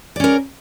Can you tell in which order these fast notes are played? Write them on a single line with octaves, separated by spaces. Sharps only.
D5 C#4 A#4